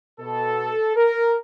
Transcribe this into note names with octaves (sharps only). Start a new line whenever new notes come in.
B2 A4
A#4